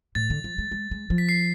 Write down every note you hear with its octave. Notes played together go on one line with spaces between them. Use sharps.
A2 A6
D3
F3
G#3
G#3
G#3
F3
B6
C7